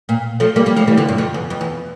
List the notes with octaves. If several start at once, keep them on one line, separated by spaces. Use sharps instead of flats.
A#2
F3 A3
G3 A#3
G3 A#3
F3 A3
E3 G3
D3 F3
G2
F2
E2
F2
E2